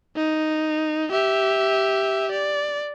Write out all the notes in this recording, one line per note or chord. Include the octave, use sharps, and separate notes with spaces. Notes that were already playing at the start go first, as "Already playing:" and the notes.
D#4
G4 E5
D5